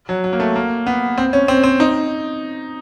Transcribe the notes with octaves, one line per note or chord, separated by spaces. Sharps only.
F#3
F#3
A#3
A3
A#3
B3
C4
C#4
C4
C4
D#4